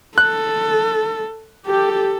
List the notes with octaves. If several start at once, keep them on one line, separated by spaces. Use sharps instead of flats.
A4 F#6
G4 A4